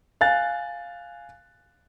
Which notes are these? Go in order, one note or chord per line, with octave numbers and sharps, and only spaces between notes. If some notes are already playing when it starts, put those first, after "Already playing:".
F5 G#5 F#6 A6